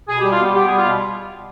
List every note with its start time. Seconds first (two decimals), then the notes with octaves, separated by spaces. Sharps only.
0.08 B2 G#4
0.21 G3 G4
0.31 F4
0.39 B3 G4
0.54 B3 G4
0.66 G3 G#4
0.77 F4
0.85 B2